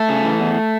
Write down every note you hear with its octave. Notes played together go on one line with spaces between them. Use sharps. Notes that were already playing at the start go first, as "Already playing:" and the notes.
Already playing: A3
C#3
E3
E2